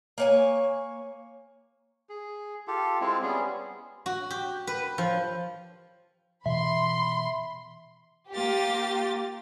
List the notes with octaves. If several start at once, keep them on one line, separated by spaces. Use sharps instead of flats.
A#3 C#5 G#5
G#4
F4 G4 A4
G#3 C4 E4 F4
G3 B3 C#4 G#4
F#4
G4
B4
F3
B2 E3 E5 B5 C6
A#3 F4 G4 A6